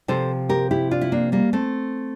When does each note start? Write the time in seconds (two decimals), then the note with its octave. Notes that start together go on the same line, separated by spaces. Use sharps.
0.08 C3 F3 A4 C5
0.49 G4 A#4
0.71 E4 G4
0.91 D4 F4
1.01 E4
1.12 A#3 D4
1.32 G3 A#3
1.53 A3 C4